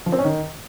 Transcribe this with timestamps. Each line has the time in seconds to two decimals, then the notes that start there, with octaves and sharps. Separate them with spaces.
0.06 F3
0.12 C4
0.18 C#4
0.25 D#3